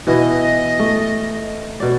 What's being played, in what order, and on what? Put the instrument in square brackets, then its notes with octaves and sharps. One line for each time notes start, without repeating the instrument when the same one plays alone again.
[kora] B2 E3 E4 [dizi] D#5
[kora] A3
B2 D5